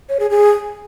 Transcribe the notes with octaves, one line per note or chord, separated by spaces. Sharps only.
C#5
G#4
G#4